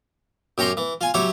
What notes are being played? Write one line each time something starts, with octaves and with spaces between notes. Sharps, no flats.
F#2 G4 C#5 A#5 C6
E3
F4 G#5
F#3 E4 G4 C#5